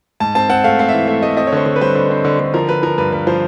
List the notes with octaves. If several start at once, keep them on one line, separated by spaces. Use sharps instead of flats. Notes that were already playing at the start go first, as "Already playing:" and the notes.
G#2 A5
C4 A5
C4 F#5
A3 F5
C4 F5
E5
E3
A3 E5
A3 D#5
C4 D#5
C#5
D3 C5
D3
B4
G3 C5
D3
C4
D3
D3
F3 A#4
F3 B4
F3 A#4
G2 B4
G2 B4
F3 C5